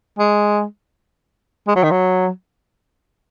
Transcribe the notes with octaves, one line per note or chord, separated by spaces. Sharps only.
G#3
G#3
F#3
D#3
F#3